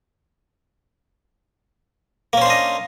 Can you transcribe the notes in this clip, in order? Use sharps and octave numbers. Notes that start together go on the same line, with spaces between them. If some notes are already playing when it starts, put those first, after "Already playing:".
A#3 C#4 D4 C5 D#5